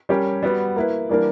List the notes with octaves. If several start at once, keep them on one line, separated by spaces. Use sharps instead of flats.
G3 C#4 G4 A#4
G3 B3 F#4
A#3 E4 B4
E3 G3 A#3 D4 A#4